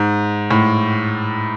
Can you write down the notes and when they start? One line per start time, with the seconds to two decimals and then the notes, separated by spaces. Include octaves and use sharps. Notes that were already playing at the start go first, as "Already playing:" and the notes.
Already playing: G#2
0.51 A2